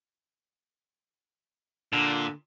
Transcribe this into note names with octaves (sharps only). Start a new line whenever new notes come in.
A#2 D3